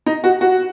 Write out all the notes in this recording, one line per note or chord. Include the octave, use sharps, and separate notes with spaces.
D#4
F#4
F#4